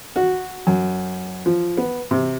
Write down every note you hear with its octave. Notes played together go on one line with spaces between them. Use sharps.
F#4
F#2
F3
B3
C3